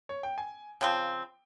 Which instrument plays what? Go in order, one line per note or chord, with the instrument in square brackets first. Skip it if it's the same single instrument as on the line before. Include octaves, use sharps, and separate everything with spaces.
[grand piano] C#5
G5
G#5
[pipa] C#3 F3 C4 [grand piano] G5